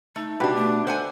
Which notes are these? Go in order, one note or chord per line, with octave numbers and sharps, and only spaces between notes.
A3 D#4
B2 D4 F#4 G4 B4
A3
A4 C5 F#5 G#5